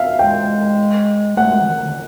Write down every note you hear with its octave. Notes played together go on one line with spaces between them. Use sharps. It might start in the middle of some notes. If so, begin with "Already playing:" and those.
Already playing: E5 F5
G#3 G5
A3 F#5
G#3
E3
D#3
D3